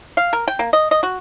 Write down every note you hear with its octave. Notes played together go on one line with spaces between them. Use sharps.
F5
A#4
G5
A#3
D#5
D#5
F#4